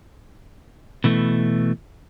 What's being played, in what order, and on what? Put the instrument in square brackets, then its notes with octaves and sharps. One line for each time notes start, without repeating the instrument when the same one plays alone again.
[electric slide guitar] B2 E3 A3